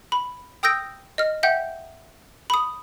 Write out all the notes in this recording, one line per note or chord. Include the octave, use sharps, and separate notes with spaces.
B5
G5 D#6 E6 G6 A#6 D7
D#5 F6
E5 F#5 G5 G6
B5 D#6